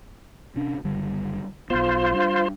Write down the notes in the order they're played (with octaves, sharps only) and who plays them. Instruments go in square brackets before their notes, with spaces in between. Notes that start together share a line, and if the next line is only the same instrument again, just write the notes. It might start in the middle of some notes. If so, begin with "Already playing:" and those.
[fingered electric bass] C3 C#4 D4
F#1 D3 G3
[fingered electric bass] B1 B3 [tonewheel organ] F4 C5
[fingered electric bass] G3 D4